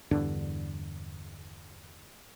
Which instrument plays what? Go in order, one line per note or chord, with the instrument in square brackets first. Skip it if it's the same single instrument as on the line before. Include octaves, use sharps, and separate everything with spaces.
[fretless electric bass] E2 G2 D3 D4